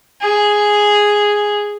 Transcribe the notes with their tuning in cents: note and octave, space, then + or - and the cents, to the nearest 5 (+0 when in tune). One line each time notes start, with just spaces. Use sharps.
G#4 +0